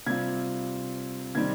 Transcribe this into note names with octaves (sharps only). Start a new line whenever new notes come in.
C3 G3 C4 F4 G#6
C3 D#3 G3 C4 G#6